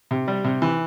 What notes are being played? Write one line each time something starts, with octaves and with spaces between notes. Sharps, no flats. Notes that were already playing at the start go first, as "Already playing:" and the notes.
C3
G3
C3
E3